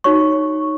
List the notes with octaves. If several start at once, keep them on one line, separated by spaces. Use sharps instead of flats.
D#4 F#4 C#5 C#6